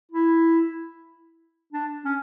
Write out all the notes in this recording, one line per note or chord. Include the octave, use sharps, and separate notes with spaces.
E4
D4
C#4